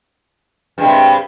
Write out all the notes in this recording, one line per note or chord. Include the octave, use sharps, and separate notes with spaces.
G2 C3 G#3